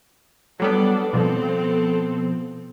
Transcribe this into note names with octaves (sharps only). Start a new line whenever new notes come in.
F#3 G3 B3 D4 A4 D5
B2 F3 B3 C4 A4